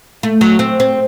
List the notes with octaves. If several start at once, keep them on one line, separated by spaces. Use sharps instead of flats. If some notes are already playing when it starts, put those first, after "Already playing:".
A3
F#3
C4
C4